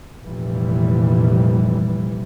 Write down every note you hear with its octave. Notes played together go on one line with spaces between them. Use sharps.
F1 A#2 E3 G3